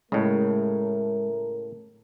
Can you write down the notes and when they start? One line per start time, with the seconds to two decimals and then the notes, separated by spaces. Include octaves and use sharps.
0.12 A2 C#3 G#3 A3 A#4